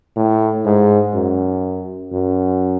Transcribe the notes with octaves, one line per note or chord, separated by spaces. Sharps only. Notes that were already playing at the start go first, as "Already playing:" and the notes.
A2
G#2
F#2
F#2